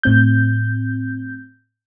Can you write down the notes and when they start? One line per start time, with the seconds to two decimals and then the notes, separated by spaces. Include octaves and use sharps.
0.03 A2 C4 G6